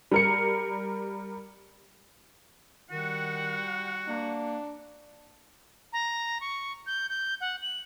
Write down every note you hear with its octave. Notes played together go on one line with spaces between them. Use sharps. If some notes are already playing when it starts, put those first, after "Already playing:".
G3 A#4 C#7
D#3 G3 F#4 F#5
A#3 D4
A#5
C#6
G6
G6
F#5
F#7